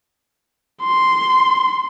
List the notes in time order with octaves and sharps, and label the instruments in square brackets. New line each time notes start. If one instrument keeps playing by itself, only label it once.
[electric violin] C6